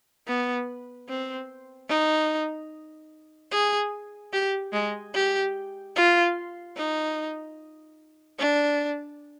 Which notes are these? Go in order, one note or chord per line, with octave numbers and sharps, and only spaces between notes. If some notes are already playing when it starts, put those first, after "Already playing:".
B3
C4
D#4
G#4
G4
G#3
G4
F4
D#4
D4